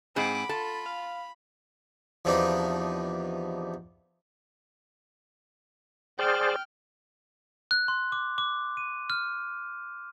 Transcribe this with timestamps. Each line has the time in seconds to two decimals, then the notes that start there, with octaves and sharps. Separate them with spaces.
0.16 G#2 C4 G#4 F#5 B5 D6
0.49 F4 A4 A5
0.86 F5
2.25 E2 C3 F3 D4 D#4
6.19 G#4 C5 D5 G5 F6
7.71 F#6
7.88 C6
8.12 D6
8.38 D6
8.77 D#7
9.10 F6